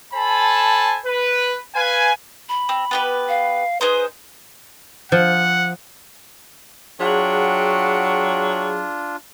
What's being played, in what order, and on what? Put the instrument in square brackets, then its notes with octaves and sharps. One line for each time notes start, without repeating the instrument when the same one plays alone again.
[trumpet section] A4 C5 G#5 A5 B5
B4
B4 F5 G#5
[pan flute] B5
[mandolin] C4
B3 G4 B4
[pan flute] F5
[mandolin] D#4 G#4 C5 [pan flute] B4
[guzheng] F3 [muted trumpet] F#5
[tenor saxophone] F#3 [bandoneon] D4 F4 [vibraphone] G#4 [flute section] F#5 G5 C#6